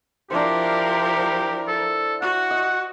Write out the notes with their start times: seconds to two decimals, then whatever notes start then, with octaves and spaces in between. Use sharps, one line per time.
0.31 F3 D4 E4 G4 A#4 C5
1.68 A4
2.22 F#4 F#5
2.51 D#5